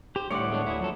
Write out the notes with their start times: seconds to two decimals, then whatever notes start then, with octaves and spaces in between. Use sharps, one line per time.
0.16 G4 C5
0.30 D2 A2 G3 C#5 F#5 C6 D6
0.50 E2 G#3 D4
0.67 D#2 E4 G#4
0.80 F3 F#3 F#4 A4